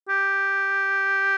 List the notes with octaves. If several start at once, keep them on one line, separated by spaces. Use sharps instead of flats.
G4